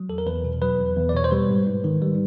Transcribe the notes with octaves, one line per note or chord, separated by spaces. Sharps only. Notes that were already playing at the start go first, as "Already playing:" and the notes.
Already playing: F#3
E2 A4
A#4
E2 B4
B2
F#3 B4
E2
E2
D5
B2 C#5
C5
G3 B4
G#2
G#2
D#3
G3